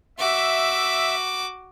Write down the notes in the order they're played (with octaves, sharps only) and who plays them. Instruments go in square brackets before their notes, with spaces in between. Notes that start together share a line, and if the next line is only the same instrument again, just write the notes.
[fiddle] F#4 D6 [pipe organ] E5